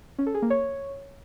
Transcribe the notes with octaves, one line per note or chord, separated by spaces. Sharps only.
C#4
A4
G#4
A#3
C#5